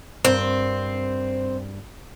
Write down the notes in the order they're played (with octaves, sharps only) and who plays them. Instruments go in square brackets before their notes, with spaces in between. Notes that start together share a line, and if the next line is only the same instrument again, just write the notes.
[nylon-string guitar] G2 A#4 [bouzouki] C4